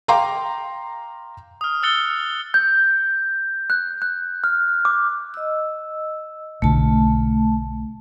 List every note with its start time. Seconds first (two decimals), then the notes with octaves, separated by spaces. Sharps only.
0.08 F5 G5 A#5 C6 D6
1.61 D#6 F6
1.82 D#6 E6 F#6 A6 C#7 G7
2.54 G6
3.70 F#6
4.02 F#6
4.44 F6
4.85 D6
5.34 D#5 E6
6.62 B1 B2 D3 A3 A5